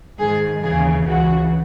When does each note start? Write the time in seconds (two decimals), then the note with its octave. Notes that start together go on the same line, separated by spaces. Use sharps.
0.19 G#2 D#3 G#4
0.62 D#2 C#3 E3 G#4
1.05 C#2 C#3 E3 F#4